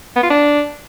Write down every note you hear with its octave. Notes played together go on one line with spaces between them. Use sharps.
B3
F4
D4